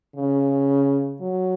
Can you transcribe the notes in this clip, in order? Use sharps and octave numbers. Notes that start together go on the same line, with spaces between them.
C#3
F#3